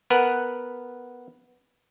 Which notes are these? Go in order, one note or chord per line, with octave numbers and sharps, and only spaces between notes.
B3 A#4 B4 F#5